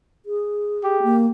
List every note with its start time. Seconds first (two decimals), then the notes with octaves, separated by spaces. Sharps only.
0.26 G#4
0.84 G4
1.03 A#3